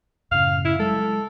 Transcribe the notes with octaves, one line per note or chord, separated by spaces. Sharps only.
F#2 A2 C#3 F5
E4
F#3 G#3 A4